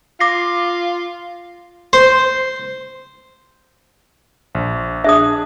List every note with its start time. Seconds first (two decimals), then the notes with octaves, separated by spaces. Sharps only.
0.20 F4 D6 A#6 C7
1.93 C5
4.55 A#1
5.04 D4 G#4 E5 D#6